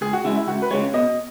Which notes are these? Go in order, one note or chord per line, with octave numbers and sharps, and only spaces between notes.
C#2 G#4
F#4
C#3 G#3 E4
E4
C#2 F#4
B4
C#3 G#3 C#5
B2 D#5